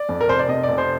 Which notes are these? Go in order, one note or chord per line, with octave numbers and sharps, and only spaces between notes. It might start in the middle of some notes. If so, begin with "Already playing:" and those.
Already playing: D5
F2
A#4
F1 C5
D5
C3 D#5
D5
F1
C5